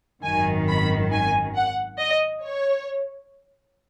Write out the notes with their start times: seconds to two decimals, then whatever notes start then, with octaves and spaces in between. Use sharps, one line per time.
0.23 G#1 F#2 D#3 G#5
0.68 B5
1.11 G#5
1.56 F#5
1.99 D#5
2.43 C#5